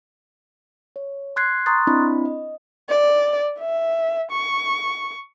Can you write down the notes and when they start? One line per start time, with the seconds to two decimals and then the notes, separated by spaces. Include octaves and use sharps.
0.96 C#5
1.36 C6 F#6 G#6 C7
1.66 A#5 C6 C#6 D#6 F#6 A6
1.87 C4 D4 E4 D#5 B5
2.25 D#5
2.89 D5
3.59 E5
4.31 C#6